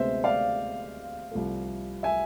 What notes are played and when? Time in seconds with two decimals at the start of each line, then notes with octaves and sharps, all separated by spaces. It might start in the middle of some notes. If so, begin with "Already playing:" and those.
Already playing: D2 C3 G#3 B3 C5 E5
0.24 D5 F5
1.31 C2 C3 F3 A3
2.03 E5 G#5